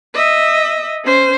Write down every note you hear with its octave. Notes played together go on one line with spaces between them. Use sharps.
D#5 E5
C#4 C5